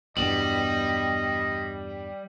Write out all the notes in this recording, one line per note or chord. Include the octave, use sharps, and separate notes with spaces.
E2 G2 B2 G3 D#5 F#7